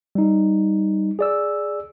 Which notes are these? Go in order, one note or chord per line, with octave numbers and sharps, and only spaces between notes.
G3 D#4
G#4 D5 E6